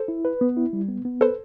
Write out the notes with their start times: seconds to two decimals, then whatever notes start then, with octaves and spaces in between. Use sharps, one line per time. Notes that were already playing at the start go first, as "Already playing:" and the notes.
Already playing: A4 C5
0.08 E4
0.25 B4
0.41 B3
0.57 E4
0.73 G3
0.89 B3
1.05 B3
1.21 A4 B4 C5